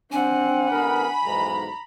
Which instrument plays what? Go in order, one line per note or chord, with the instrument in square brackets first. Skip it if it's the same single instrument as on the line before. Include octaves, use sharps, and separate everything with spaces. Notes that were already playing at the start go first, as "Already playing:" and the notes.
[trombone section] C4 [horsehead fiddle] D4 F#5 [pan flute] G#5
[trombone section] A1 B3 A#4 [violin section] B5
[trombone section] B1 E2 G#2 [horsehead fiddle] A#5